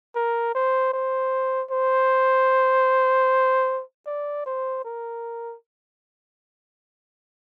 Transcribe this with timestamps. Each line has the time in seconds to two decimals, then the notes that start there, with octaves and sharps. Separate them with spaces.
0.16 A#4
0.55 C5
0.94 C5
1.71 C5
4.07 D5
4.46 C5
4.85 A#4